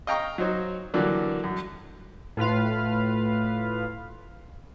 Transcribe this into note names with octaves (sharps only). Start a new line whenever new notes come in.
D#5 F5 G5 A#5 C#6 F6
F#3 D#4 C5 C#5
D3 E3 F#3 G3 A#3
F#2
A2 F4 B4 F5